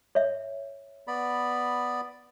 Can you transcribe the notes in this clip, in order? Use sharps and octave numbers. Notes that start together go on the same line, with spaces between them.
C#5 E5
B3 D5 B5